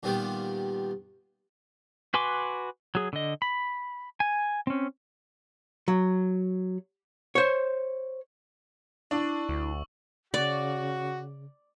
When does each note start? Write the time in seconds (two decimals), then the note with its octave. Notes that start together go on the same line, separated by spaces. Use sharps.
0.03 A#2 D#3 G3 B3 F4 G4
2.14 F#4 B4 G#5 C6 D6
2.95 F#3 G#4
3.13 D3 D#5
3.42 B5
4.20 G#5
4.67 C4 C#4
5.88 F#3
7.35 C5 C#5
9.11 D4 E4 C#6 E6 F#7
9.49 D2
10.34 C#3 F#4 D5